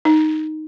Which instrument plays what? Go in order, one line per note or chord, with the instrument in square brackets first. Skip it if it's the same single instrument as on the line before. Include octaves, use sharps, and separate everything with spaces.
[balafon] D#4